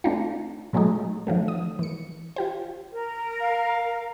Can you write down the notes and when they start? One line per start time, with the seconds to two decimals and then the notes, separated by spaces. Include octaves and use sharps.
0.04 A3 C4 D4 D#4 F4
0.73 A#2 F#3 G#3 A3 D#4
1.27 D#3 F3 F#3 A3
1.48 D#6
1.79 E3 C#7
2.36 F4 G4 C5
2.92 A#4
3.41 F5